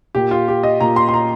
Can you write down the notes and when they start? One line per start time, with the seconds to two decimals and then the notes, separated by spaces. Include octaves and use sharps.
0.15 A#2 G4
0.31 F4
0.48 G4
0.63 D#5
0.80 A#2 A#5
0.96 C6
1.09 C6
1.14 A#5